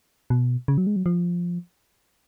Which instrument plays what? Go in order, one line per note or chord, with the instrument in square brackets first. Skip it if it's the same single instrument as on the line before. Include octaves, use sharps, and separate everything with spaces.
[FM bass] B2
C#3
F#3
G#3
F#3
F3